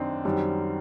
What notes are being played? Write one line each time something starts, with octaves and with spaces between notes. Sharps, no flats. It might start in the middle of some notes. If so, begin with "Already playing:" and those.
Already playing: F#2 D#3 C4 D4 D#4
F#2 D#3 G3